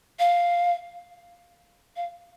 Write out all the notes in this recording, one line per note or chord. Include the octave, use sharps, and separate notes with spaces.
F5
F5